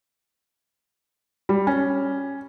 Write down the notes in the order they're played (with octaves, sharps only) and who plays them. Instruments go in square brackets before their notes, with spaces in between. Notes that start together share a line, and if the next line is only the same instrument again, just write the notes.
[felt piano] G3
C#4